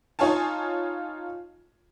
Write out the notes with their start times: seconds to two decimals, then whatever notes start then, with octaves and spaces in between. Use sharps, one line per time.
0.19 D#4 F4 C#5 F5 G#5 A5